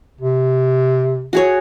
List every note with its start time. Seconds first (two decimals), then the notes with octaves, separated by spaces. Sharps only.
0.21 C3
1.33 F#4 G#4 C#5